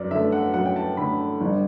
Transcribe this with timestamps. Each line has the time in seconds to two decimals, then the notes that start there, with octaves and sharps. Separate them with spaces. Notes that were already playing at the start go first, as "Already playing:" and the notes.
Already playing: F#2 D5
0.11 D3 A3 E5
0.32 F#5
0.54 F#2 F#5
0.65 G5
0.76 A5
0.97 D3 A3 B5
1.41 G1